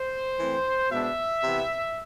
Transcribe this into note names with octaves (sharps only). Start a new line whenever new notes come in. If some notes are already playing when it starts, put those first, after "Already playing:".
Already playing: C5
E3 A3 C4
B2 G#3 B3 D4 E5
C3 E3 B3